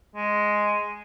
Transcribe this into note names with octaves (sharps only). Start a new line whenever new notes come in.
G#3